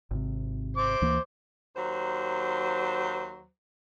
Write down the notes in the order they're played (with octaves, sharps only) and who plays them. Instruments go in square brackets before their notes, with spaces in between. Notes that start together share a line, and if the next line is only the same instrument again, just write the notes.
[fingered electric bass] G#1 C3
[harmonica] C5 D6
[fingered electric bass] D2 E3 A#3
[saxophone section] D#2 F#3 C5